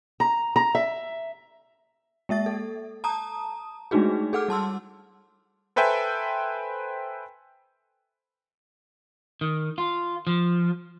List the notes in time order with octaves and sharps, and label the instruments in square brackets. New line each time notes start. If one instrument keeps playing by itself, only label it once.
[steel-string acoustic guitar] A#5
A#5
E5
[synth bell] G#3 A#3 E5 A6
A4
A5 A#5 D#6
G#3 A3 D4 D#4 F#4 G#4
G#4 A4 F#5 D6 F6
G3 A5 C6 E6
[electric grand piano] A4 B4 C5 E5 G5 G#5
[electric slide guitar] D#3
F4
F3